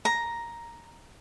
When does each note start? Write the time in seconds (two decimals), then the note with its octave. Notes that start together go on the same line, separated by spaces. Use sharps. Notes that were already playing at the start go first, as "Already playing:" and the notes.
0.05 A#5